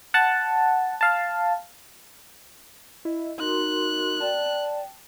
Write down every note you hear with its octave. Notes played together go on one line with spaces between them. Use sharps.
F#5 A5
F5 A5
E4 D#5
D#4 F#4 A#4 C6 F#6
D5 G5 A5